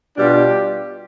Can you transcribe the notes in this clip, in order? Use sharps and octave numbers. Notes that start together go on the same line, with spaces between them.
B2 G3 D4 F4 G4